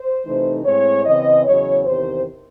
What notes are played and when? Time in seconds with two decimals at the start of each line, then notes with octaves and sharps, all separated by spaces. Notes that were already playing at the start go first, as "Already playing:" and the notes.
Already playing: C5
0.24 C3 E3 A3 D#4
0.64 A2 G#3 C4 C#5
1.04 C#3 E3 C4 D#5
1.45 E2 C#3 F#3 C#5
1.85 E2 C3 D#3 C5